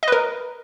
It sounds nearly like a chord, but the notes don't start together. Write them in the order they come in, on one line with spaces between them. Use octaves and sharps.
D#5 B4 A#4